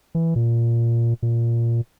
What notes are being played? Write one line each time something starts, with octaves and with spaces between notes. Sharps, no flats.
E3
A#2
A#2